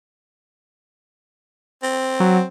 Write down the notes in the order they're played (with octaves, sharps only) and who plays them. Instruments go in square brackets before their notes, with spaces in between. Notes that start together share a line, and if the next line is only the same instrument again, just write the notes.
[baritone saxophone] C4
[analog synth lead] F#3